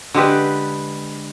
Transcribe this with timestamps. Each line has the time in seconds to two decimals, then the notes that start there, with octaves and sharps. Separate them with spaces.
0.14 D3 G#3 G4 B4